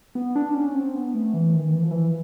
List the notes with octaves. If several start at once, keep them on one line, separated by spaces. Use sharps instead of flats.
B3
D4
C#4
C4
B3
A3
E3
D#3
E3
F3
E3